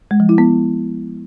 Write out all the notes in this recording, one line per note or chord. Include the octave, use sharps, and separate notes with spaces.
G#3
F3
E4
B3